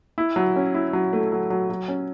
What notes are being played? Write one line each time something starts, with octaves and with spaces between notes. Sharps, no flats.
E4
F#3
C#4
E4
F#3
A3
F#3
F#3
F#3
C#4